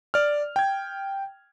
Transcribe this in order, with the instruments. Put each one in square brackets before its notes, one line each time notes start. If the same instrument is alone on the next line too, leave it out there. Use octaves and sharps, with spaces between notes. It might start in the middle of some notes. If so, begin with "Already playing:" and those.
[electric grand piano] D5 F6
G5 G#6